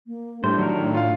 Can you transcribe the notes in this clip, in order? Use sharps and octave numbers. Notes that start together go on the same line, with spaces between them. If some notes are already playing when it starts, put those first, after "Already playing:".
A#3
A2 G3 D4 C5
D#3 F#3 F#4 A#4
D4 F4 F5